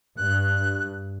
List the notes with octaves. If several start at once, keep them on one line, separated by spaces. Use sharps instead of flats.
G2 F#6